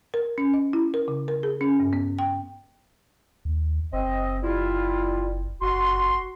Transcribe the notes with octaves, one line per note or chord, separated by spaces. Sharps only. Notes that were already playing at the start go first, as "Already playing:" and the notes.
A#4
C#4
D#5
E4
A#4
C#3
A#4
G#4
C#4
G2
B3
G5
D#2
F#1 C4 D#5
G3 E4 F4
F#1 F#4 C6